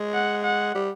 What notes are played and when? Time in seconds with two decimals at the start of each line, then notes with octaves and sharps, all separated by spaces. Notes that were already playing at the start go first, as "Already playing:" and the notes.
Already playing: G#3
0.14 F#5
0.44 F#5
0.74 G3